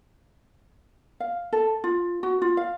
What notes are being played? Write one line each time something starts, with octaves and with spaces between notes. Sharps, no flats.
F5
A4
F4
F#4
F4
F5